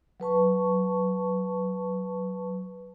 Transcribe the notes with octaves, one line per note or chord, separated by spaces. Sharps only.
F#3 B4 A5 C#6